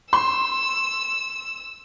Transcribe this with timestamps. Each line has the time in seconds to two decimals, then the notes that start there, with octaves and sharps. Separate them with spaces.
0.13 C6 E6